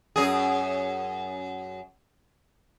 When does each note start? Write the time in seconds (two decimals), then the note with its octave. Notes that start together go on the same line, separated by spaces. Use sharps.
0.16 F#2 G#4